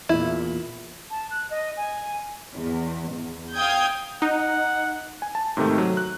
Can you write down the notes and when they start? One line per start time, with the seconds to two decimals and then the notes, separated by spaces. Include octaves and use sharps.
0.09 E2 A#2 E4
1.10 A5
1.31 F#6
1.50 D#5
1.77 G#5
2.56 E2
3.11 E2
3.54 F5 G5 D#6 G6 G#6
4.22 D#4 F#5
5.22 G#5
5.35 A5
5.57 G#2 C3 D#3 A3
5.78 F#3
5.97 F#6